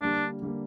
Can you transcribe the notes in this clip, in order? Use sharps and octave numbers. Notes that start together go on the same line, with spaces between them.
D3 G3 A#3 D4
D3 G3 A#3